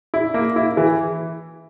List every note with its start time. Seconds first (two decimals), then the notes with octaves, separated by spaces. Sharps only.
0.14 E4
0.34 A#3
0.56 E4
0.77 E3